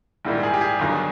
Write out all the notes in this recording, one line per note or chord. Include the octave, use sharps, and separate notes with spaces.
A#1 G#2 D#3 G3 E4
G#4
G4
G#4
G1 G2 D#3 F#3